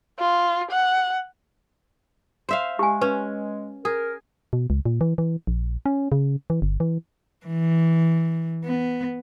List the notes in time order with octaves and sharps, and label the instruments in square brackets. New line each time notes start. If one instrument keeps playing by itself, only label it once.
[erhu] F4
F#5
[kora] C5 E5 F5
[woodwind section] G#3 [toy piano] G4 G#5
[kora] C#4 [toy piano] B4
[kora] G#4 [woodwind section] A#4
[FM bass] B2
C#2
A#2
E3
E3
A#1
C#4
C#3
E3
G1
E3
[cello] E3
B3